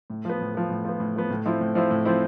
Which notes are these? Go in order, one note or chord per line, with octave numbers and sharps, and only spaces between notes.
A2
F3 B3
A2
F3 B3
A2
F3 B3
A2
F3 B3
A2
F3 C4 E4
A2
F3 C4 E4
A2
F3 C4 E4